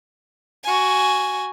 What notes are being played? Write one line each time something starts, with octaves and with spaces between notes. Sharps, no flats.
F#4 G#5